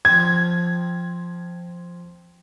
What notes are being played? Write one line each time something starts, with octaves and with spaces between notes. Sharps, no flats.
F3 C4 G#6